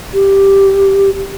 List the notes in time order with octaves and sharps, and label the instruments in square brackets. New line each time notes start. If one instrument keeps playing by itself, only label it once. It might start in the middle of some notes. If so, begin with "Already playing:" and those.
[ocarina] G4